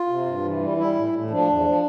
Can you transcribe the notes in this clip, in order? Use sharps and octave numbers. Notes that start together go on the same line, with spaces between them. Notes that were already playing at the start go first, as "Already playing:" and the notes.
Already playing: F4
C3
G2
E3
G3
G3 E4
A2
A2
F3 D4
E2
F3